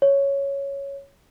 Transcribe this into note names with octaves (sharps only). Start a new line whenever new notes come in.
C#5